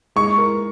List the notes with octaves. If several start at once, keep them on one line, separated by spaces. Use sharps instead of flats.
G#3 C#6
A#4